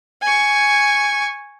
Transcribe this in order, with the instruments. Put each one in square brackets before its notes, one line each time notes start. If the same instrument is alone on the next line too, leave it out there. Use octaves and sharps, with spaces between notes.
[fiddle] G#5 C#6